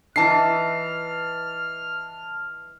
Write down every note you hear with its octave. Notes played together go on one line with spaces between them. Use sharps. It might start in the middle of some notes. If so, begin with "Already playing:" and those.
E3 D#4 A5 F6 C7